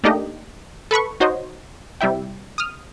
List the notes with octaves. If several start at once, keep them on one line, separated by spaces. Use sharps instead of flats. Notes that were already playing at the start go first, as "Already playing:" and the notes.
A3 A#3 D4 D#4 G4 D#5
A4 B4 B5 C#6
D#4 F#4 C5 C#5 D#5
C3 G3 E4 E5 G5
D#6 F6